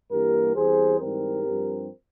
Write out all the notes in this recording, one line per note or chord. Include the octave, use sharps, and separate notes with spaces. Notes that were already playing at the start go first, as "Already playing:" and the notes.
G2 E3 G3 A#3 G4 A#4
E2 E3 G3 C4 G#4 C5
G#2 E3 G3 C4 G4 A#4
G2 F3 C4